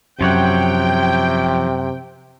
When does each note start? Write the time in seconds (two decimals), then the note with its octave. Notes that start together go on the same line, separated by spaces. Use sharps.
0.21 F#2 C3 F3 C#5 F#5 G5